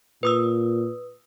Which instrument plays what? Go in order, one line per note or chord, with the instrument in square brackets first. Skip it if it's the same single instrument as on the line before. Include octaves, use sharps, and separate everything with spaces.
[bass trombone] A#2 [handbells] B4 D#6 E6